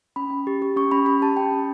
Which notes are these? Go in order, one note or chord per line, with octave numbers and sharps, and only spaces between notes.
C#4 B5
C#4
G4
G4
C#4 C#6
C#4 B5
G4 B5
G4 A5
C#4 G5
C#4